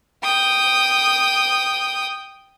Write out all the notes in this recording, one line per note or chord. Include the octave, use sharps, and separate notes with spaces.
G5 D#6